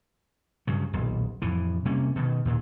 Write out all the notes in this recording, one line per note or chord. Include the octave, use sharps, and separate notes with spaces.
G2 C#3 F#3
D#1 B1
F2 A2 E3
C3 G3 A#3 C#4
B2 D#3
D#2 A#2